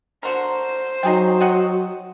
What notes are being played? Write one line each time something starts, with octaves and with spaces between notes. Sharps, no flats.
D3 F#4 A#4 C5
F#3 D#4 G#4 G5
D#5 F#5 G5